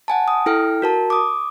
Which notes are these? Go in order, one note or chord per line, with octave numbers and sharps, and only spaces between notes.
F#5 G#5 A5
D#6
E4 A4 G5 F6
F#4 A#4 A5
D6 D#6